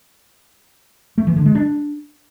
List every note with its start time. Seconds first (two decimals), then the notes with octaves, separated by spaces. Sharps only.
1.18 A3
1.27 E3
1.36 D3
1.46 G#3
1.55 D4